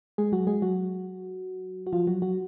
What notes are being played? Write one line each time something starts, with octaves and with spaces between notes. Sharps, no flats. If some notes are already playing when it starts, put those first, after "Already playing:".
G#3 G#4
F#3 F#4
G#3 G#4
F#3 F#4
F#4
F3 F4
F#3 F#4
F#3 F#4